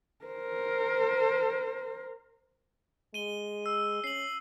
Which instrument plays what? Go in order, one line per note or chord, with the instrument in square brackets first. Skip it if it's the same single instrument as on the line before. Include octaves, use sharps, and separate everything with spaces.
[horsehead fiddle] A#4 C5
[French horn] G#3 [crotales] D#7 G7
[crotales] E6
[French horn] C#4 [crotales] C7 F#7